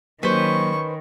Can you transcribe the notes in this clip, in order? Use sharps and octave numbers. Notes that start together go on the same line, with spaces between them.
D#3 F#3 A#3 C#4 B4 C5 C#6